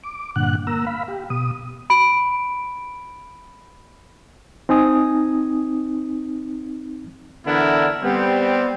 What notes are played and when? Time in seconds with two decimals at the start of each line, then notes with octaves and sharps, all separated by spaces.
0.04 D6
0.36 G2 A#2 D3 F#5 F#6
0.67 A#3 A#5 E6
0.87 F5 B5
1.08 G4
1.30 B2 D#6
1.90 B5 D7
4.69 C4 D#4 G#5 D#6
7.47 D3 E3 B3 D4 E4 A#4
8.03 G3 B3 C4